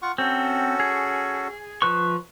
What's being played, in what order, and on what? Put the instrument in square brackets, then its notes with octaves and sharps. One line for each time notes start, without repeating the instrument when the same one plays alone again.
[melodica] F4 F#5 C#6
[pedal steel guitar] C4 [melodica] C#4 F#4 A4
[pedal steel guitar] G#4
F3 B4 C#6